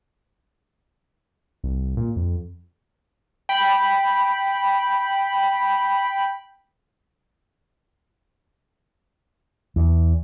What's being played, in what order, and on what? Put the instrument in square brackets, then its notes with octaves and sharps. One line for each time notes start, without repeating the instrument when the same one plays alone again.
[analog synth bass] C2
A#2
F2
[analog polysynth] G5 B5
[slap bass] E2